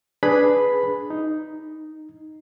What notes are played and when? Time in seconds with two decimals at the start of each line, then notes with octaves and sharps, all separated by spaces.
0.23 D4 G#4 B4 B5
1.10 D#4